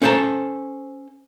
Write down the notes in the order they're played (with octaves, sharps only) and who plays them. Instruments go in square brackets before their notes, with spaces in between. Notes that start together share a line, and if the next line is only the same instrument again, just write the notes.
[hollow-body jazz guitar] C#4 A4 C5 D5 A5 A#5